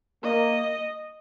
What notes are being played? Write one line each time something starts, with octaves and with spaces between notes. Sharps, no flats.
A#3 D#5